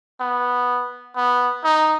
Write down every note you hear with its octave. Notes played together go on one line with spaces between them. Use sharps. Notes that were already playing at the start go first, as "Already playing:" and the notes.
B3
B3
D#4